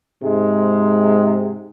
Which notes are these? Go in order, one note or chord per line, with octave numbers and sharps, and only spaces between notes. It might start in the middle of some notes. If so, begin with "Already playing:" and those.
G#2 C3 G#3